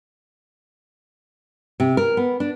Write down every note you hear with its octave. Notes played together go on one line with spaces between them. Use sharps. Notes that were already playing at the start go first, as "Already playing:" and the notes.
C3
A#4
B3
D4